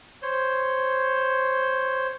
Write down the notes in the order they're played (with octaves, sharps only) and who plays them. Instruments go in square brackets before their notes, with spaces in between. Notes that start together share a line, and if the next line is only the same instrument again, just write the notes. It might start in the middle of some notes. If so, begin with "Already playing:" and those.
[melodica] C5 C#5